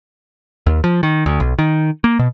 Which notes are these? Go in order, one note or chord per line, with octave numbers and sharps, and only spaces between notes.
D#2
F3
D#3
D2
B1
D#3
A#3
B2